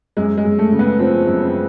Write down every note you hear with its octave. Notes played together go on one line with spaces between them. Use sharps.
F#2 G#3
G#3
F#2
A3
C#3
B3
F3 C4
F#2
C4